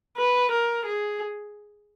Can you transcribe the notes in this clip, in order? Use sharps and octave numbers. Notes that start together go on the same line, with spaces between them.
B4
A#4
G#4